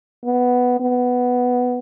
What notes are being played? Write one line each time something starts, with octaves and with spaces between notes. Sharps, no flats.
B3
B3